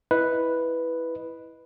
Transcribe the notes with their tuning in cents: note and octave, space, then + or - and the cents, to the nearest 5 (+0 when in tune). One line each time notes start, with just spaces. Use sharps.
E4 +0 B4 +0 D#5 +0